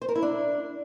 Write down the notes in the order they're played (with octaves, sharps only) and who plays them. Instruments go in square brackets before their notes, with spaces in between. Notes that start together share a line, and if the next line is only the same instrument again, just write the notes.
[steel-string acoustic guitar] C5
A#4
E4
D4